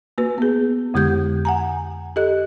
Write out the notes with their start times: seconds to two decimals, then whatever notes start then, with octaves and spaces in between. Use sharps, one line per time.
0.18 A#3 F#4 B4
0.38 B3 G#4
0.94 F2 D3 G#3 G4 G6 G#6
1.45 F#5 G#5 A#5
2.16 G4 A4 D#5 F#6